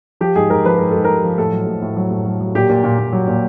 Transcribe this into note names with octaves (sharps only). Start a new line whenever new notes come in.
F3 G4
G#2 G#4
G#2 A#4
F3 B4
G#2 A#4
G#2 A4
F3 A#4
F3
A2 A4
F#3
A2
A2
F#3
A2
F#3
F#3
A#2 G4
A#2
A#2
A#2
F#3
A#2